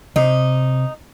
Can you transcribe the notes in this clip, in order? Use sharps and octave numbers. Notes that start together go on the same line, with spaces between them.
C3 D#4